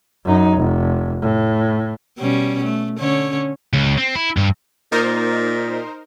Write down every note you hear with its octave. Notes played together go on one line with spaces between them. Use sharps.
F#2 D#4
F1
A2
B2 G3 C#4
A3
D3 C#4 C#5
C#2
C4
E4
G2
A#2 D#4 A#4 C5